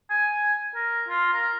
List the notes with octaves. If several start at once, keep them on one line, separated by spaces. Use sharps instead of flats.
G#5
A#4
F4
A#4